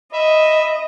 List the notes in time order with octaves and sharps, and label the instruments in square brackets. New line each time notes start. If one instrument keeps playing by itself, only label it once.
[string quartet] D#5 [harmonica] E5 B5